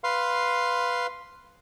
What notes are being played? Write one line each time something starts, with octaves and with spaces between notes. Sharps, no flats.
B4 F5 C6